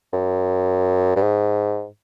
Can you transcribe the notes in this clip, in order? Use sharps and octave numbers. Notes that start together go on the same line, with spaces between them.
F#2
G2
G#2